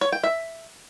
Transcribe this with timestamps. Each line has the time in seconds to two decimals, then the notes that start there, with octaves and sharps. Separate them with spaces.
0.01 C#5
0.12 G5
0.24 E5